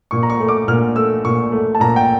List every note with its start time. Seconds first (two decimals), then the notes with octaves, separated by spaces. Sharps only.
0.11 A#2 C#6
0.23 A#5
0.30 C#6
0.40 A3
0.48 D6
0.68 A#2 F6
0.96 A3 E6
1.25 A#2 C#6
1.52 A3
1.75 A5
1.80 A#2 A#5
1.96 G5